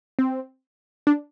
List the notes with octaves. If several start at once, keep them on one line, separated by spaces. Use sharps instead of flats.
C4
D4